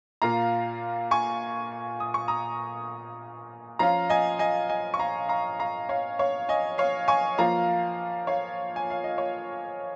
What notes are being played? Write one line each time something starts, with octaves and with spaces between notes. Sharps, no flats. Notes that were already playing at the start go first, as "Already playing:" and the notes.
A#2 A#3 F4 F5 A#5
G#5 C#6
D#6
C#6
A#5 D#6
F3 C#4 F4 F5 A#5
D#5 G#5
D#5 G#5
D#5 G#5
C#6
F5 A#5
F5 A#5
F5 A#5
C#5 F5
C#5 F5
D#5 G#5
C#5 F5
G#5 C#6
F3 A#3 F4 F5 A#5
C#5 F5
G#5
F5
D#5
C#5